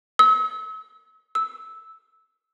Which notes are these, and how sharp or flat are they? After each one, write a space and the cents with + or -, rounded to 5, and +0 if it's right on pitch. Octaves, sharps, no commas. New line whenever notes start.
E6 -40
E6 -15